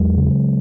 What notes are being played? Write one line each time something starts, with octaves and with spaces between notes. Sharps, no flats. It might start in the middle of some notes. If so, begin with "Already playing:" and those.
Already playing: E2 F#3 G#3
C#3